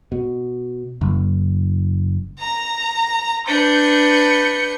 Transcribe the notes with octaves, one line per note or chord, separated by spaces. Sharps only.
B2
F#1
A#5
D4 B4 G6 C#7